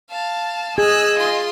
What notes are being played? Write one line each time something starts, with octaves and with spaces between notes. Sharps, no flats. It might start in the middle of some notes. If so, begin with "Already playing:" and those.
F5 A5
G#4 D#5 G#5 E6 F#6
F4 C6